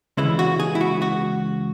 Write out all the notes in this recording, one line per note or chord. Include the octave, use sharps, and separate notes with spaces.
C#2 C#3 E3 G#3 E4
F#4
G#4
E4
F#4
F#4